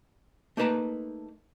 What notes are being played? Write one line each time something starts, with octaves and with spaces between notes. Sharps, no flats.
A3 A#3 D#4 B4 A5 A#5